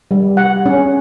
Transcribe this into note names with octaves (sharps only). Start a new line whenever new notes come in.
G3
F#5
C#4